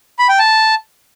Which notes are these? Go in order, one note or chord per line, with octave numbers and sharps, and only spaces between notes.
B5
G5
A5